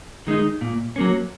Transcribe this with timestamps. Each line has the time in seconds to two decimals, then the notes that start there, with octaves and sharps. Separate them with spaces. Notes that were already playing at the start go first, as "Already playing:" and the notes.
0.27 D#3 G#3 D#4
0.61 A#2
0.96 F#3 A#3 C#4